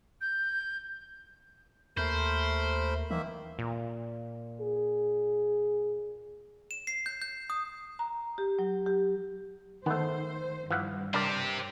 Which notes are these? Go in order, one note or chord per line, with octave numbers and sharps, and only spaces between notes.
G6
D#2 A3 A#4 C5 B5
D#3 E3 A#3 E5
A#2
G#4
E7
C7
G6
G6
D#6
A#5
G4
F#3
G4
D#3 A3 B3 C5
G2 E3 F3 F#5
D4 G4 A#4 C5 D5